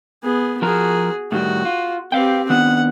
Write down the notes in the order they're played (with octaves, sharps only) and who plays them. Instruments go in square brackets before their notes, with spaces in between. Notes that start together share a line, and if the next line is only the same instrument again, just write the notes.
[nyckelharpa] B3 G#4
[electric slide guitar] F3 A#4 [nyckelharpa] F#4 G#4
[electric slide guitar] A2 D#3 G3 [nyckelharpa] F#4
[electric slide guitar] F4
[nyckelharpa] C4 G4 [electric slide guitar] B4 F5 G5
[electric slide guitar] D#3 B3 D4 [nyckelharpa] F#5